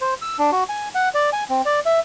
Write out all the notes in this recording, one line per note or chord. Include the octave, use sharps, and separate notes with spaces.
C5
E6
D4
F#4
G#5
F#5
D5
G#5
C4
D5
E5